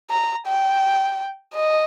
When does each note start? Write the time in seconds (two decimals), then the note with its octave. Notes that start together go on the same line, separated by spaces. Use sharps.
0.10 A#5
0.47 G5
1.55 D#5